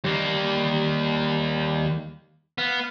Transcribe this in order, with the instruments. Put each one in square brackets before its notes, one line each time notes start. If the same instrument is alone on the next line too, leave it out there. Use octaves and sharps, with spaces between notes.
[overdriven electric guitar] D#2 A#3 [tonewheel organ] G3
[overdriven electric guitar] B3 [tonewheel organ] F5